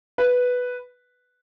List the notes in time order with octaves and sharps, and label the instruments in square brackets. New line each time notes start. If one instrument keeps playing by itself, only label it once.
[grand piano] B4